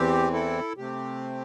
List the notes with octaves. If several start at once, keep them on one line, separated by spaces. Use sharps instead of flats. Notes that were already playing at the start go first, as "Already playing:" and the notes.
Already playing: E2 E3 C4 G4
E4 A4
C3 A3 C4 G4